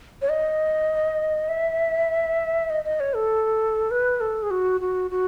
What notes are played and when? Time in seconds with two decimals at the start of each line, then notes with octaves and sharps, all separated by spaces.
0.22 C#5
0.29 D#5
1.49 E5
2.70 D#5
2.84 D#5
3.00 C#5
3.15 A4
3.91 B4
4.20 A4
4.42 G#4
4.50 F#4
4.81 F#4
5.11 F#4